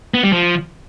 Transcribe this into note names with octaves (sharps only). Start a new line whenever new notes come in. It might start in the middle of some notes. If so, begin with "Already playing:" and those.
B3
G3
F3